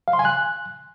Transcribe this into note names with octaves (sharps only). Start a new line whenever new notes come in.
F5
C6
G#5
F#6